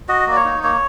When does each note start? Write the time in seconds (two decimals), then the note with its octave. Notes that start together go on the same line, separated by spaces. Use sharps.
0.08 F#4 D#5
0.27 A#3 D5
0.36 C#5
0.45 D#4
0.63 A#3 C#5